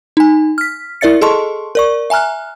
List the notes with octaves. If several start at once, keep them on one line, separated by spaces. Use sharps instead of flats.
D#4 G#5
F6 B6
E4 A#4 D5 E5 A6 C#7
G#4 A4 D#5 A5 C6 C#6
A#4 D5 C#6
E5 G#5 A#5 F6 F#6